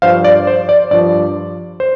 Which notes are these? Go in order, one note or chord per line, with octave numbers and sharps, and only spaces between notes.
G2 F3 C5 F5
D5
C5
D5
G2 F3 D5
C5